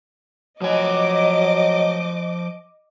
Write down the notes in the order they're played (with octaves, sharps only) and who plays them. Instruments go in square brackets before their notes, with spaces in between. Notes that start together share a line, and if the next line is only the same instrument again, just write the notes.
[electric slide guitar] F3 G#5 [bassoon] F#3 [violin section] D#5 D6